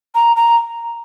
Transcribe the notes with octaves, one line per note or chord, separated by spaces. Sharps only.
A#5
A#5